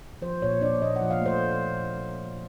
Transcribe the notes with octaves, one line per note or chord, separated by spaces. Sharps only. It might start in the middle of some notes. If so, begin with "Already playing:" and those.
F3 C5
A#2 C#5
D4 D5
A#2 D#5
F#5
F3
F5
A3 C5